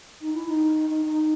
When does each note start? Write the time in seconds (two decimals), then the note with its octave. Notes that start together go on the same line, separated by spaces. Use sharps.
0.21 D#4
0.34 E4
0.48 D#4
0.90 D#4
1.05 D#4